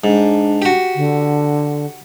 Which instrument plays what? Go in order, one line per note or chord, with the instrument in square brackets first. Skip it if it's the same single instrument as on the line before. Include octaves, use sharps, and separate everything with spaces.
[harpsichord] G#2 [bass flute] D4
[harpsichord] F#4 G4
[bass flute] D3